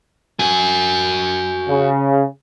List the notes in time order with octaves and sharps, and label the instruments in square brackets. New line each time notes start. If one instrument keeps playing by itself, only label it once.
[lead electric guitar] F#4 G#5
[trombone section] C#3